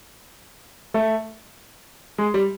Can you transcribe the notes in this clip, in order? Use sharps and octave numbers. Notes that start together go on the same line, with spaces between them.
A3
G#3
G3